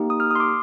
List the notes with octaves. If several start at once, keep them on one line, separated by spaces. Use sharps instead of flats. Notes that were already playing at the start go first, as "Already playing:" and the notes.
Already playing: A#3 D#4 G4
D#6
F6
D#6
C6
D6